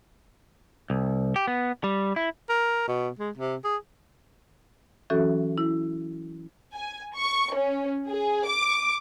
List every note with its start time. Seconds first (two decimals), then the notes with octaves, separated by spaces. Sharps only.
0.90 C2
1.36 G4
1.48 B3
1.84 G3
2.16 E4
2.50 A#4
2.88 B2
3.19 G#3
3.38 C3
3.64 G#4
5.10 E3 F#3 C#4 F#4 A4 E5
5.58 E4
6.74 G#5
7.15 C#6
7.54 C#4
8.08 G#4
8.47 D6